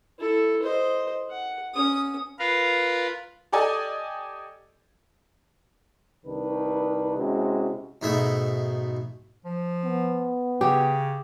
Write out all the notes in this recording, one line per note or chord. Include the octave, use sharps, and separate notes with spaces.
E4 A4
C5 D#5
F#5
C#4 D#6
F4 A#4 B4 F5
G4 A4 D5 D#5 G#5
C2 C3 D#3 D4 B4
C3 G#3 C#4 E4 F#4
G#2 B2 A3 E5
F3
B3
C#3 G4 G#4